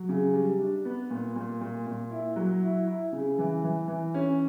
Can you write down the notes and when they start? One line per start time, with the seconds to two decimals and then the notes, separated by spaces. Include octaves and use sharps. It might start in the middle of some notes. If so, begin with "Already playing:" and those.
Already playing: F#3
0.09 C#3
0.33 G3
0.60 D4
0.85 B3
1.10 A#2
1.36 A#2
1.61 A#2
1.87 A#2
2.11 E4
2.36 F#3
2.63 E4
2.87 E4
3.12 C#3
3.39 E3
3.64 E3
3.88 E3
4.14 C#4